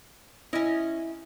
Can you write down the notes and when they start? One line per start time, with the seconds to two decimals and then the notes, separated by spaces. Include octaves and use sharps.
0.53 C#4 E4 D#5